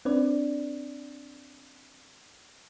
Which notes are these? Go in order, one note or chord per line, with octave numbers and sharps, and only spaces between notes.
C4 D4 B4 D5